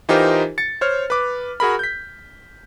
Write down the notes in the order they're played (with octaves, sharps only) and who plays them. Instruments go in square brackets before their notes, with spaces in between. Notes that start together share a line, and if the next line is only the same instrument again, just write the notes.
[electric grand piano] E3 D#4 F4 G4 A#4 C5
A6 C#7
C5 C#5 F6
B4 D6
F#4 G#4 A#4 B5
G6 B6